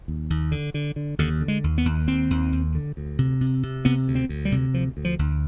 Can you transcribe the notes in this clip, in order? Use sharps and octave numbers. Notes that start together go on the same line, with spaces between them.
D#2
D#2
D3
D3
D3
D#2 D3
D3
G#3
D#2
B3
D#2
D#2 C4
D#2
D#2
D3
D2
C3
C3
C3
C3 B3
D2
C4
D2
G3
C3
D2 F3
D2
F3
D2